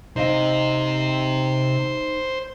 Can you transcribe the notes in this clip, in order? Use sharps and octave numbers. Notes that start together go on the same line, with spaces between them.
C3 C4 D#4 C5 D#5 F5